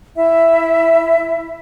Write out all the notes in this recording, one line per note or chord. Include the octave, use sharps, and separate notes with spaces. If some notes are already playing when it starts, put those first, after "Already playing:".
E4 E5